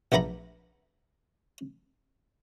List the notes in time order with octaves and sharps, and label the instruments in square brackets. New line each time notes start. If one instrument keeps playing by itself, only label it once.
[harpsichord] A#1 A3 B3 A#5 B5